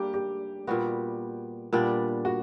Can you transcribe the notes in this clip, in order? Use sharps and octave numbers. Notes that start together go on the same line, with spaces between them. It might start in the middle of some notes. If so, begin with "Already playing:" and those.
Already playing: G3 A#3 D4 G4
G4
A#2 G3 B3 F#4
A#2 G3 B3 D4
F#4